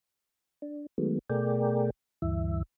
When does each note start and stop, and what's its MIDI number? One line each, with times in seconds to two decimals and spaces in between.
0.62 0.86 62
0.98 1.19 51
0.98 1.19 54
0.98 1.19 56
0.98 1.19 57
0.98 1.19 59
1.30 1.90 47
1.30 1.90 57
1.30 1.90 68
1.30 1.90 70
1.30 1.90 74
1.30 1.90 79
2.22 2.63 38
2.22 2.63 43
2.22 2.63 52
2.22 2.63 76